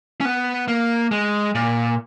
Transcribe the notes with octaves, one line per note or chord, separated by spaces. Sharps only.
C#4
B3
A#3
G#3
A#2